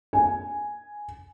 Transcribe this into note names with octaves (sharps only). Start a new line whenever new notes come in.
G#5